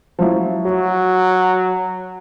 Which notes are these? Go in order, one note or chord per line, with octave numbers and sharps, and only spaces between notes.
F3 F#3 E4
F#3 F#4